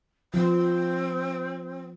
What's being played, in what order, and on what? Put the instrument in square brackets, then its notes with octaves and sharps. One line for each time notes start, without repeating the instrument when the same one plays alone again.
[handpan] F3 [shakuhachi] C4